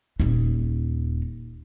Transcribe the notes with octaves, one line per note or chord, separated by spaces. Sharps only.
D#1 D#4